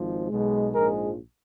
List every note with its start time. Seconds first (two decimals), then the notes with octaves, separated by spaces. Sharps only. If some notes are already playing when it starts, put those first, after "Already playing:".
Already playing: G#1 G#2 F3
0.28 B1 B2 G#3
0.72 A#1 G#2 F3 G#3 A#4